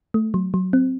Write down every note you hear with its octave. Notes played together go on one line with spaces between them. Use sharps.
A3
F#3
F#3
C4